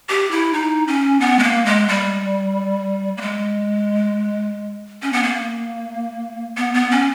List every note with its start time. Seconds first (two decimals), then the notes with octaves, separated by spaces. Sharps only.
0.09 G4
0.31 E4
0.53 D#4
0.87 C#4
1.21 B3
1.39 G#3
1.43 A#3
1.66 G#3
1.88 G3
3.17 A#3
3.21 G#3
5.02 C#4
5.13 B3
5.23 A#3
6.57 B3
6.74 B3
6.91 C#4